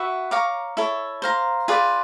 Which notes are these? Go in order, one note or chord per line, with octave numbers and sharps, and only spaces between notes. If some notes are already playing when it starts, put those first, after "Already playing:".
Already playing: F#4 B4 E5
C#5 F5 A#5 D6
E4 A4 C#5
C5 F5 A#5
F4 G#4 B4 D5